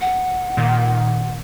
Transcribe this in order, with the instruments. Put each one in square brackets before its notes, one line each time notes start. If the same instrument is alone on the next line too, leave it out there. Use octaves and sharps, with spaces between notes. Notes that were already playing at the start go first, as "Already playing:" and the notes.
[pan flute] F#5
[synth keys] A#2 D#3